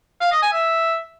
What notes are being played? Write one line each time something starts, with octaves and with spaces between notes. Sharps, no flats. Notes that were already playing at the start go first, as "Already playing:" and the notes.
F5
D#5
G#5
E5